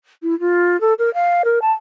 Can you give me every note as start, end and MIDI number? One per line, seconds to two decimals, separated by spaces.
0.23 0.38 64
0.40 0.79 65
0.80 0.93 69
0.98 1.12 70
1.14 1.42 77
1.44 1.59 70
1.61 1.72 81